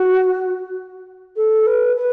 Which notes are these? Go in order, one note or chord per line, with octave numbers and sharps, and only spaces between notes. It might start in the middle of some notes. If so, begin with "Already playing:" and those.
Already playing: F#4
A4
B4
B4